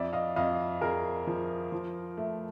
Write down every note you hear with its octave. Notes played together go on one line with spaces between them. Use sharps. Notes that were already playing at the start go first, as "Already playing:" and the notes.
Already playing: F2 D5 E5
D#5 F5
F2 D#5 F5
F2 G#4 A#4
F3
F3
A3